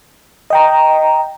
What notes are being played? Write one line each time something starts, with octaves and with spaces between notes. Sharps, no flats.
D#5 G5 A#5